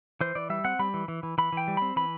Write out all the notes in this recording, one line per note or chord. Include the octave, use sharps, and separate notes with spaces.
E3 C5
E3 D5
G3 E5
C4 F#5
G3 B5
E3
E3
E3
E3 B5
E3 G5
G3
C4 B5
E3 B5